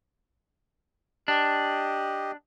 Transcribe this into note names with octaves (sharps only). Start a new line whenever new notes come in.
D4 G4 D#5